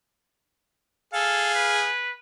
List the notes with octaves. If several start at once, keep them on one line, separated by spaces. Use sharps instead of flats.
G#4 A4 F5
B4